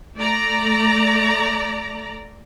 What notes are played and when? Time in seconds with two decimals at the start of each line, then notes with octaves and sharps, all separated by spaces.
0.17 A3 D5 A#5